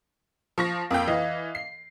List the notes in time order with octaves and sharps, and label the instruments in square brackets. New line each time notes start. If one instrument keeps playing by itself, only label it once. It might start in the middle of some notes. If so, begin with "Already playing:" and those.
[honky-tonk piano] F3 C#6 A#6
[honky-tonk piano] F2 G5 [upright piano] A#3
[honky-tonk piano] E3 [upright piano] D#5 F5
[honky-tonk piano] C7